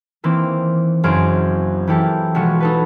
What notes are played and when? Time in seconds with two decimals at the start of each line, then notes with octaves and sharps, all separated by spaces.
0.24 D#3 E3 A#3 C4
1.03 F#1 F#2 G#4 C5 F6 D7
1.87 E3 A#3 E4 G4 A4
2.35 B1 F3 G#3 F#4 C#6
2.60 D#4 A4 B4